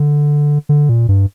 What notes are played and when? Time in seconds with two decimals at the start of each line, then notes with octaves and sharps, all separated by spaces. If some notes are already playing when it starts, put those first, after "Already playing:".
Already playing: D3
0.69 D3
0.89 A#2
1.09 G2